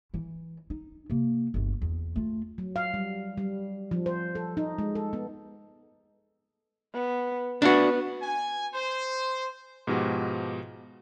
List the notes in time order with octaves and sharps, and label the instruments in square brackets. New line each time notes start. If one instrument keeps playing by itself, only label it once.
[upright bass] E3 E4
D#4
C3 A#3
G1 D2
E2
A3 F4
[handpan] F#3
F5
G3
G3
F3
C5
A4
D#4
G#3
A4
B3
[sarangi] B3
[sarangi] B3 [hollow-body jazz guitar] D4 F#4
[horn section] G#5
C5
[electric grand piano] G#2 B2 F3 F#4 G4